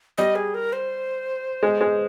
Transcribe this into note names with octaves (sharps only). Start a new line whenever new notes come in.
G3 D#5
G#4
A#4
C5
G#3
G#3